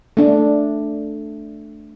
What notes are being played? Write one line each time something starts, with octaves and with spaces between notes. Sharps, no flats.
A3 D4